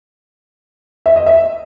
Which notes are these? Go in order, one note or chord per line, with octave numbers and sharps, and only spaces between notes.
E5
D#5
E5